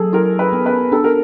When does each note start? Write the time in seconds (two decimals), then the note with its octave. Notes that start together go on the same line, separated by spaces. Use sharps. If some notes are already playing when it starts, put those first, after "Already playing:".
Already playing: F#3 G#4 A4
0.13 E4 A#4
0.39 B4
0.53 B3
0.66 B4
0.92 D4 A4
1.04 A#4